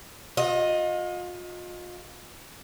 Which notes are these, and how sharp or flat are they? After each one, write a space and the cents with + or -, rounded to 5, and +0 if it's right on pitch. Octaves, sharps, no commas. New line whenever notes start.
F4 +35 D#5 +0